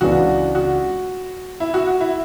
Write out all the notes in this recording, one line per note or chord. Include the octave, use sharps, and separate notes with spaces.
C#2 C#3 E3 B3 D4 F#4
F#4
E4
F#4
F#4
E4